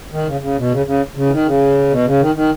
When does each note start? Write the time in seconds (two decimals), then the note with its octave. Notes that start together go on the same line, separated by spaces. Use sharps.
0.12 D#3
0.26 C#3
0.41 C#3
0.57 B2
0.71 C#3
0.86 C#3
1.16 C#3
1.26 E3
1.31 D#3
1.46 C#3
1.90 B2
2.05 C#3
2.21 D#3
2.35 D#3